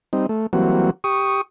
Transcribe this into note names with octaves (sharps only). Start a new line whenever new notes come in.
G3 C4 D#4
A3
E3 F#3 G3 A#3 C4 F#4
G4 C#6 D#6